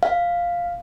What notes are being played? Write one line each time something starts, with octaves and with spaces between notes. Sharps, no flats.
F5